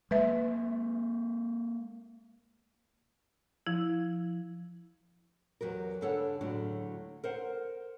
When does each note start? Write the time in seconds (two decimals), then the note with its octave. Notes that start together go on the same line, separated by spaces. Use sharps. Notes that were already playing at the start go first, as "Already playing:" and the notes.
0.11 G#3 A#3 B4 E5
3.67 F3 E4
5.61 E2 F#3 G4 A#4
6.01 G2 C#3 D4 A4 C#5 F#5
6.41 D2 A2 F#3 G#3 D4
7.24 A#4 C5 F#5